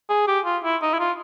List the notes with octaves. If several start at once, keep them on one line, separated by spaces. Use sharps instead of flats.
G#4
G4
F4
E4
D#4
E4
F4